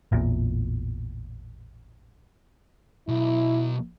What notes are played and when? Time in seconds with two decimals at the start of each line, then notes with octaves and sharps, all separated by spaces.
0.12 A1 E2 A#2
3.08 B1 E4